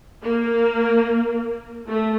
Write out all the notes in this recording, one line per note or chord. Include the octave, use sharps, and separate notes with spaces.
A#3
A3